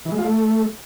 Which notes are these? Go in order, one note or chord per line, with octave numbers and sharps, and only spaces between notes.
E3
G#3
F4
A3